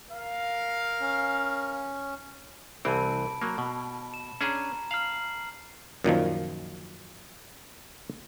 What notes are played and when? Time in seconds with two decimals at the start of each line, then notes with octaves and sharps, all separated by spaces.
0.11 A#4 F5
1.00 C#4
2.85 C2 E3 C4 A5 B5 D7
3.42 F#3 A#3
3.58 B2
4.14 E7
4.41 C#4 D4 G#4 A#5 E7
4.91 F5 F6 C7 F#7
6.04 F#2 A#2 D#3 F3